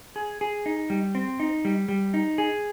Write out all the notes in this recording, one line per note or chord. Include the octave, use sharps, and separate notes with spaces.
G#4
G#4
D#4
G3
C4
D#4
G3
G3
D#4
G#4